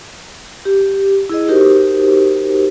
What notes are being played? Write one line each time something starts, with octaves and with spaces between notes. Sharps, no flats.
G4
E4 G#4 D#5
D#4 F#4 G4 A#4 C5